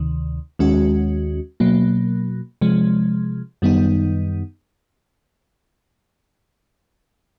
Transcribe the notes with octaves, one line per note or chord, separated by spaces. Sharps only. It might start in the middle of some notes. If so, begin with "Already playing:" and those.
Already playing: D2 C3 D#3
D#2 D#3 G#3 C#4 F#4
B2 F#3 A#3
C3 F3 G#3
F#2 D#3 G3 B3 D#4